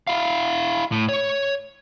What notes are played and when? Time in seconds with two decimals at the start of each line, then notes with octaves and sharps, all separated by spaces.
0.07 E4 F5
0.92 A2
1.09 C#5